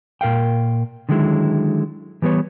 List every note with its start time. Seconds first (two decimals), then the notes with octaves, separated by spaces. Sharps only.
0.21 A#2 A#4 F5 G5
1.09 D3 D#3 F#3 G#3 E4
2.22 E3 G3 B3 B4 C#5